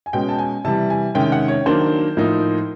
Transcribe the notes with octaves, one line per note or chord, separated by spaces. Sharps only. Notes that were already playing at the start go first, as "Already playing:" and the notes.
G#5
B2 G#3 C#4 G5
A5
G#5
C3 E3 G3 A5
G#5
C3 D#3 G#3 C#4 G5
F#5
C#5
D#3 F#3 A#3 D4 C5
A2 F3 A#3 D#4